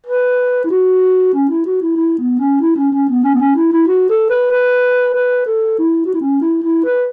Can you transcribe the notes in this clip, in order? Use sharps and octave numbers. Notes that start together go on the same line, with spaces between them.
B4
E4
F#4
C#4
E4
F#4
E4
E4
B3
C#4
E4
C#4
C#4
B3
C#4
B3
C#4
E4
E4
F#4
A4
B4
B4
B4
A4
E4
F#4
E4
C#4
E4
E4
B4